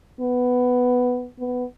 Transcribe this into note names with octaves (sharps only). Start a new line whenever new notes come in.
B3
B3